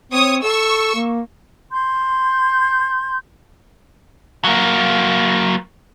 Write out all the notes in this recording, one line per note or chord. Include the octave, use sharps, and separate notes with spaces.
C4 C#5 D#6
A4 C#6 E6
A#3
C6 G6
F#3 A#3